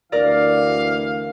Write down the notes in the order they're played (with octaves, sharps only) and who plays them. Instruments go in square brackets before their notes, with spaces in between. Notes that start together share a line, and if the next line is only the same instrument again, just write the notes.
[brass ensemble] D2 E3 F5 [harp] A#4 D5